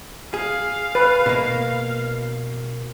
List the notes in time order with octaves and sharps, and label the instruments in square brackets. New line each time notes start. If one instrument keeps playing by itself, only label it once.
[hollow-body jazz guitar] G#4 [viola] F5
[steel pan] B4
[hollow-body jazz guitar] B2 A#3